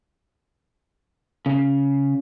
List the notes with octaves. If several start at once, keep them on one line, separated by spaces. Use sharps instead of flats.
C#3